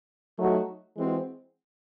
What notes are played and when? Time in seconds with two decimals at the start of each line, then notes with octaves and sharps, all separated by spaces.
0.38 F#3 A3 D#4 F#4
0.96 E3 G#3 C4 F#4